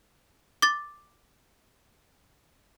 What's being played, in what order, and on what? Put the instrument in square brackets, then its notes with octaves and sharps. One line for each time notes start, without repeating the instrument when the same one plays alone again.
[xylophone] D6 A6